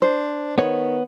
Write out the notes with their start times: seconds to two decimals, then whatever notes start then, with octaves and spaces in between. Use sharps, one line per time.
0.02 D4 C5
0.58 D#3 B3 C#5